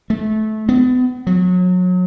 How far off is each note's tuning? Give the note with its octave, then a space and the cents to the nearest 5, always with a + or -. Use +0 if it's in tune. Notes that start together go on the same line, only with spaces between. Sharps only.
A3 -20
B3 +35
F#3 -30